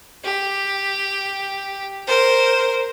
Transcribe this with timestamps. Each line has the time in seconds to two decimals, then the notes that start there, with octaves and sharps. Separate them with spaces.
0.24 G4
2.07 A#4 C5